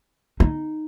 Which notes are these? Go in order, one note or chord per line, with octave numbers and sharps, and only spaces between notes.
D#4